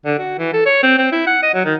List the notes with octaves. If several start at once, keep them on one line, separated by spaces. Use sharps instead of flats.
D3
F#4
E3
A4
C#5
C4
C4
E4
F#5
D#5
F#3
D#3